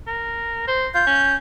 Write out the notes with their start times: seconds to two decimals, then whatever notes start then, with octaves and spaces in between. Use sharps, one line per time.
0.07 A#4
0.67 C5
0.94 F4 G6
1.07 C#4